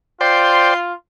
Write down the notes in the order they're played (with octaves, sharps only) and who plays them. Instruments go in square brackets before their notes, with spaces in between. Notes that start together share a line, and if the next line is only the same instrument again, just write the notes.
[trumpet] F4 [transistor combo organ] C5 D5 G5 [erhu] C6